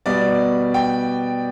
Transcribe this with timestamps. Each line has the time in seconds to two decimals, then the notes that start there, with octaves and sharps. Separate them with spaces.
0.06 B2 G3 D5
0.74 G5